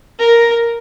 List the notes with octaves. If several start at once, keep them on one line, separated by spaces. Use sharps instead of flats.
A#4